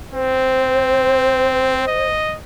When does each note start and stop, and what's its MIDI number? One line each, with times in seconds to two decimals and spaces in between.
0.13 1.87 60
0.13 2.07 72
1.87 2.36 75